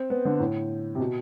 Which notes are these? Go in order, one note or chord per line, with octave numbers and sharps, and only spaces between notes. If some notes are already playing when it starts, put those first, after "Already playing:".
Already playing: C4
B3
D3
A2
C3
B2